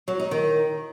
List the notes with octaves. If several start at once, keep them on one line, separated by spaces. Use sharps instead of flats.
F#3
D#4
D#3